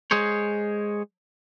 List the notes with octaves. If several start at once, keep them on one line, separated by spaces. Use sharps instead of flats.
G#3 G#4 C5 C#5